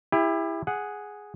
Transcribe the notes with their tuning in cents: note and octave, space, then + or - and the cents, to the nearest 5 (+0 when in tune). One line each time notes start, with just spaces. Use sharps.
E4 +0 G4 +40
G#4 +0 F#5 +0